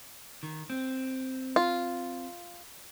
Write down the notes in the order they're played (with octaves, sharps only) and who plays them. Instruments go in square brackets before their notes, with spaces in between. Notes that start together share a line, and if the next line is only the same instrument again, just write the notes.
[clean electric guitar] D#3
C4
[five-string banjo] F4